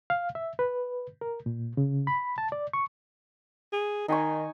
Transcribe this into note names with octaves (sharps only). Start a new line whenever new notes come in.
F5
E5
B4
A#4
A#2
C#3
B5
A5
D5
C#6
G#4
D#3 D#4 G#5 C#6